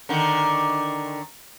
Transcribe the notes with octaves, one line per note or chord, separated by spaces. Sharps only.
D3 D#3